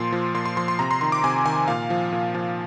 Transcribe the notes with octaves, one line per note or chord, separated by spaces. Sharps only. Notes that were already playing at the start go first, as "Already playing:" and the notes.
Already playing: A#2 F3 C6
F3
A#2 C6
C6
F3 C6
C6
C3 A#5
C6
D#3 C6
D6
C3 G#5
D#3 G#5
A#2 F5
F3
A#2
F3